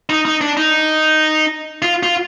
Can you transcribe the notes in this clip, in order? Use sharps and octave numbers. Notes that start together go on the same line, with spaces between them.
D#4
D#4
D4
D#4
F4
F4